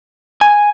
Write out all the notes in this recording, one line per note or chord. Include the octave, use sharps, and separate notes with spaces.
G#5